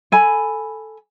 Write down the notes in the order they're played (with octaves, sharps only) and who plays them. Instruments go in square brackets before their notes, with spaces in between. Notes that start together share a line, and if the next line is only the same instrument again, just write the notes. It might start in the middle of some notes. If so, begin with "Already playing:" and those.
[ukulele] A4 G#5 B5